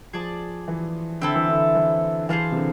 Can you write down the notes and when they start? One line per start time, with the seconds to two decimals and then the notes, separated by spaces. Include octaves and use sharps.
0.13 F3 G#4 D5 A5
0.68 E3
1.21 D3 C4 E4 A4
1.35 E3
1.49 D3
1.75 E3
2.29 E3 G#4 C5 F5 A5
2.52 C3
2.56 D3